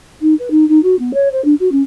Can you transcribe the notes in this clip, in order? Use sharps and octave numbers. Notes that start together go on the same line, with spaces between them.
D#4
B4
D#4
D#4
F#4
B3
C#5
C5
D4
F#4
C#4